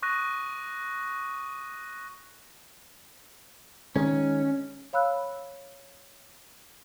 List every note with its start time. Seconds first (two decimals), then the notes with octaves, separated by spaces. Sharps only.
0.02 C#6 D#6 F#6 A#6 D#7
3.96 D#3 G#3 C#4
4.93 C#5 F5 B5 E6 F#6